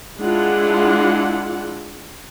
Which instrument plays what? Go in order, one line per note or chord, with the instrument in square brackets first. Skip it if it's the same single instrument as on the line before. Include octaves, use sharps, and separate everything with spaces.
[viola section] G#3 D4 E4 F4 F#5